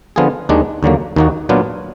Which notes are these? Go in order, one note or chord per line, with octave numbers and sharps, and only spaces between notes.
D3 F3 B3 F4 G#4
D#2 D#3 G#3 D4
D#2 D3 F#3 A#3
D#2 D#3 A#3 D#4 F#4
A#2 F#3 B3 D4 F4